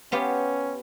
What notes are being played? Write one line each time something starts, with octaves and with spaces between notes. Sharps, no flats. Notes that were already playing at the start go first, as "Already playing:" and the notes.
B3 C#4 F4 G4